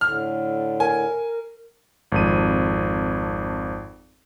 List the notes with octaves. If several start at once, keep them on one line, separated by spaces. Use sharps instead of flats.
A2 D3 F6
A#4 G#5
G#1 F2 D#7